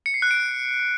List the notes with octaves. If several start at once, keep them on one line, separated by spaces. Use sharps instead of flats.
C#7
C7
F#6
D7